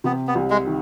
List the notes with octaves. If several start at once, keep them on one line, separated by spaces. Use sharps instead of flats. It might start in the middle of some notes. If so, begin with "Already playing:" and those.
C3 B3
B3
C2
G#3
D#3